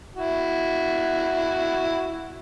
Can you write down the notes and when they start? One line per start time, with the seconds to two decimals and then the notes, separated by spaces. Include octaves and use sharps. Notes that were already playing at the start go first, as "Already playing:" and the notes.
0.16 E4 F#4